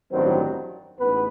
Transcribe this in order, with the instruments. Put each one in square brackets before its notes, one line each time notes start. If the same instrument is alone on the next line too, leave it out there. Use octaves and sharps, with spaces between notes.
[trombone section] A1 G2 D#3 F#3 C4 C5
A1 G#2 B3 B4